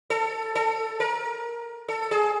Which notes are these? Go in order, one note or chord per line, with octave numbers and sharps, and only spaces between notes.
A4
A4
A#4
A4
G#4